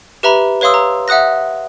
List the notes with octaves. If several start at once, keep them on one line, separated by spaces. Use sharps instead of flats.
G4 B4 E5 A#5 B5
B4 C#5 F5 C6 D#6 E6
A#5
E5 F#5 D#6 F#6 A#6